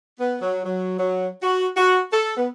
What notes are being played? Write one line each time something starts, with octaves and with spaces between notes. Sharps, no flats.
B3
F#3
F#3
F#3
F#4
F#4
A4
B3